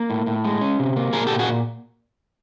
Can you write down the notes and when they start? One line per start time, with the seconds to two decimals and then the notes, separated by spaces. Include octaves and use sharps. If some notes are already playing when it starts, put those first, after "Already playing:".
Already playing: A#3
0.10 A2
0.26 A2
0.45 G#3
0.61 C#4
0.79 C3
0.96 A#3
1.13 A#2 G#4 A#4
1.27 A#2 G4 A4
1.39 F#4 G#4